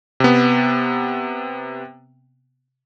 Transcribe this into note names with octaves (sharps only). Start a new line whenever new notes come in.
C3 B3